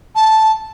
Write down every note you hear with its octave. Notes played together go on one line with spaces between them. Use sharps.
A5